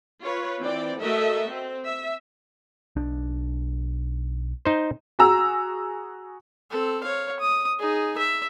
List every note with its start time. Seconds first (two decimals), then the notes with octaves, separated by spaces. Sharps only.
0.22 F4 B4 C#5
0.63 E3 C4 D5 G5
0.99 A3 F#4 A4 A#4 D#5 E5
1.49 C4
1.87 E5
2.96 B1 D4
4.65 D#4 C5
5.19 F#4 G#4 A#5 E6
6.71 C4 A4
7.04 C#5 F5
7.40 D#6
7.79 D#4 G#4
8.18 E5